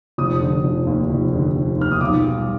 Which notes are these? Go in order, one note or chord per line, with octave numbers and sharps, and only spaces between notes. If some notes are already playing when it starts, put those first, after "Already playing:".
F1 D#6
D3
F1
D#2
F1
D3
F1
D#2 F6
D#6
B1 D6
G3